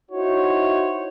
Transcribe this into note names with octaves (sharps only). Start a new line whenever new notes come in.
D#4 E4 F#4 C5 C#5